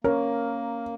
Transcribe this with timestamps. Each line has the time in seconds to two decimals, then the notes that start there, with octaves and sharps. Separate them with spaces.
0.04 A#3 C#4 A#4 C#5